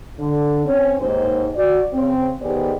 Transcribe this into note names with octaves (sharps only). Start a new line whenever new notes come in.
D3
C4 C#4
D#2 G#2 C5
F#4 D5
C#3 C4
D#3 B3 G4 G#4 C5 D5